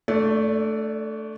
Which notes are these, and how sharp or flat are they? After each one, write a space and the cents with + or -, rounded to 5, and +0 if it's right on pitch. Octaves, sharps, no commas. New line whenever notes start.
A3 +0 D4 +10 D5 -40